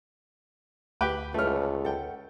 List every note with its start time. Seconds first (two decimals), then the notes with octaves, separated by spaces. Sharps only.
1.01 D2 G4 B4 G5
1.34 C#2 A3 B4 C#5 F6
1.85 A4 F#5 G5